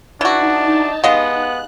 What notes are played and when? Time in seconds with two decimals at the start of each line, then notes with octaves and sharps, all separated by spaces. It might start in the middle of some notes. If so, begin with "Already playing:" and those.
0.21 E3 D4 D#4 F#4 A5
1.04 G#3 B3 G4 D#5 F5 F#5 F#6